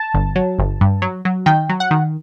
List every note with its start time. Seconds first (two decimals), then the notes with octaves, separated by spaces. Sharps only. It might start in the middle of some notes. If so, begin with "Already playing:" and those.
Already playing: A5
0.14 G1
0.36 F#3
0.59 G1
0.81 G2
1.02 F#3
1.25 F#3
1.46 D#3 G5
1.69 F#3
1.80 F#5
1.91 D#3